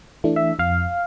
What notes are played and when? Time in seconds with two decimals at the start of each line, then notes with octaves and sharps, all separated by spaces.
0.24 E3 A3 D4
0.36 E5
0.59 F2 F5